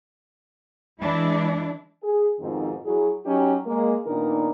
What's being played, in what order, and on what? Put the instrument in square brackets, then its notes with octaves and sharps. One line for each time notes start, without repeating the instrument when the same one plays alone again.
[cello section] E3 G#3 D4 E4
[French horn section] G#4
F2 G#2 B2 D#3 F3 C4
F#3 E4 G#4
F#3 C#4 D#4 G4
G#3 A#3
A#2 D#3 B3 D4 D#4 A#4